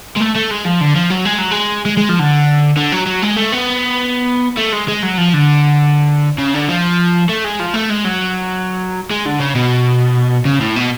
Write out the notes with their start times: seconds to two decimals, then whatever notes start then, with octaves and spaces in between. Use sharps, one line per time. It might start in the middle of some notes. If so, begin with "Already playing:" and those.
0.16 G#3
0.20 A3
0.35 A3
0.50 G#3
0.65 F3
0.81 D3
0.95 F3
1.10 F#3
1.25 G#3
1.38 F#3
1.51 G#3
1.86 G#3
1.97 G#3
2.09 F3
2.19 D3
2.77 D3
2.92 F#3
3.06 F#3
3.22 G#3
3.36 A3
3.52 B3
4.57 A3
4.73 G#3
4.88 G#3
5.03 F#3
5.18 F3
5.34 D3
6.38 C#3
6.54 D3
6.69 F3
7.29 A3
7.44 G#3
7.60 F3
7.74 A3
7.90 G#3
8.05 F#3
9.10 G#3
9.26 D3
9.40 C#3
9.55 B2
10.45 C#3
10.61 A2
10.76 B2